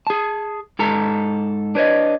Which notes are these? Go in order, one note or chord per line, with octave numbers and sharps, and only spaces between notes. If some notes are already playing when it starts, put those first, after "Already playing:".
G#4 A5
G#2 A4 A#5
D4 B4 C#5 D#5